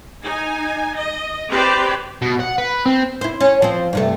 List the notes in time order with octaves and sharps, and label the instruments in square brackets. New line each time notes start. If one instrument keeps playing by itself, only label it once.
[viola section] D#4 G#5
D#5
C4 G4 B4 C5 D5
[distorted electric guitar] B2
F#5
B4
C4
[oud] E4 C5
C#4
F3 C4
G2 C3 A3